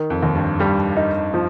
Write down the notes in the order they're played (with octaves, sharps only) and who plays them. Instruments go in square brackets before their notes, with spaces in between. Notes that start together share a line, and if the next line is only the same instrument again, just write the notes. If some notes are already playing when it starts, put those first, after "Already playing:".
Already playing: [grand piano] D#3
[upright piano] F2
[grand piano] D#2
[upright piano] G2
[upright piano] G2 [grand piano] G3
[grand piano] D#4
F3